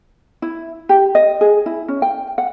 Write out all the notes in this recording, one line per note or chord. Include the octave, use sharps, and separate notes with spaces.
E4
G4
D#5
G#4
E4
C#4
G5
F#5